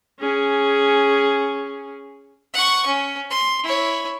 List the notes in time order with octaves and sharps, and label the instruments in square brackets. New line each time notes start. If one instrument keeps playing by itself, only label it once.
[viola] C#4 G#4
[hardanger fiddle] F#5 C#6
C#4
C6
E4 C#5